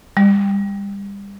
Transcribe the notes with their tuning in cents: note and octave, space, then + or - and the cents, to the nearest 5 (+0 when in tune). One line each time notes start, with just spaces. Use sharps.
G3 +30